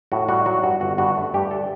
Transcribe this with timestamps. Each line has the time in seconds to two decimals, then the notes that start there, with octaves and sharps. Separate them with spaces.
0.12 A2 F#4
0.28 G3 F#4
0.46 F#3 F#4
0.63 G2 F#4
0.81 G1 F#4
0.98 G2 F#4
1.17 A3
1.34 G2 G4
1.51 D3 A4